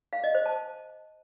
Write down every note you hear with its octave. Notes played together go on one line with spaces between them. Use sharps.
F5
D#5
C5
A5